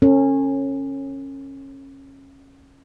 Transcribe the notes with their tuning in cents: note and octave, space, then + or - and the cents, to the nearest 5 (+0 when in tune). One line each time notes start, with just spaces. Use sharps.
C#4 -20 A4 +40